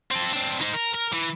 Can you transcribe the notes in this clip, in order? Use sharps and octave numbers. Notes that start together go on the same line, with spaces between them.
C4 A4
C4 D4
D#4 C5
A#4
A#4
E3